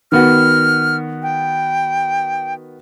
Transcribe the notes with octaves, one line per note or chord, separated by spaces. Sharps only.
D#3 B3 F#4 F6
G5